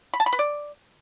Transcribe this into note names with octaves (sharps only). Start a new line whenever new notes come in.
B5
A5
B5
B4
D5